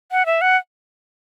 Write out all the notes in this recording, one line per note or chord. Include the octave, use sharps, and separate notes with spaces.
F#5
E5
F#5